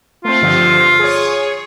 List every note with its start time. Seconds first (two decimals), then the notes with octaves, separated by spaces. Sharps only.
0.25 A3 C4 F4
0.41 G2 D3 F3
0.99 G#4 C#5